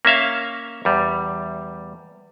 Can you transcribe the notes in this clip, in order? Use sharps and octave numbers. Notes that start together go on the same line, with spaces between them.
A#3 C#4 E5 F5
E2 G3